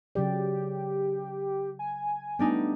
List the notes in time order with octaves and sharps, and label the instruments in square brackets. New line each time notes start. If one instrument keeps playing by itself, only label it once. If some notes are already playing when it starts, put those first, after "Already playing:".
[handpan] C#3 F#3 D5 [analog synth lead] G4
[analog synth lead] G#5
[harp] G3 D4 D#4 [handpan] A3 B3